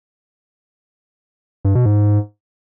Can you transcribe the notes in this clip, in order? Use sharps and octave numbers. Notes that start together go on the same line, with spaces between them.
G2
B2
G#2